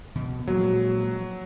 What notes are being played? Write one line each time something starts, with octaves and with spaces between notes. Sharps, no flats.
B2
A#2 F3 F#3 G#3 F#4